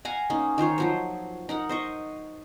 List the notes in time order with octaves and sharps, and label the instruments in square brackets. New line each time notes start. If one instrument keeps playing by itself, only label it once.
[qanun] F5 F#5 G#5 A#5
A#3 C#4 D#4
D#3 F4 C5 C#5
F3 F#3 C5
D#4 A#4 F#5
C5 D#5 C#6